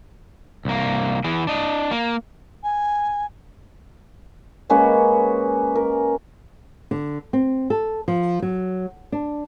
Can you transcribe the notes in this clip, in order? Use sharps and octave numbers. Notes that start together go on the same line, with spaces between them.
C2 A#3
E3 G#4
D4 D#5
A#3
G#5
G#3 A#3 C#4 B4
A#4
D3
C4
A4
F3
F#3
D4